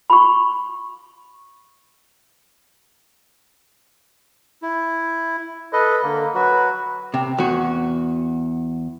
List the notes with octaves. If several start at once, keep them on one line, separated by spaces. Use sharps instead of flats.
B5 C#6
E4
A4 B4 D#5
D3 A#3
F#3 F#4 B4
C3
E2 F#4